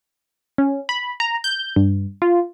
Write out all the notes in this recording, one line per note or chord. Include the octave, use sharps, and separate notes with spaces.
C#4
B5
A#5
G6
G2
F4